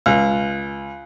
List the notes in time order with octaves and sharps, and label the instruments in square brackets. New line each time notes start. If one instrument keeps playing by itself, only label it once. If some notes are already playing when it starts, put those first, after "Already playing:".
[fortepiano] C#2